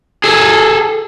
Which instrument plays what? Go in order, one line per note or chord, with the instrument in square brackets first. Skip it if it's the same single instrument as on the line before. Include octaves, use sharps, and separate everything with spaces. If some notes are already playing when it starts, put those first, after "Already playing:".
[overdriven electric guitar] G#4 A4